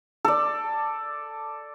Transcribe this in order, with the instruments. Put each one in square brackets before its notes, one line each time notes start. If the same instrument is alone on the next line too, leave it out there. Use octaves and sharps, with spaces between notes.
[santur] A4 D5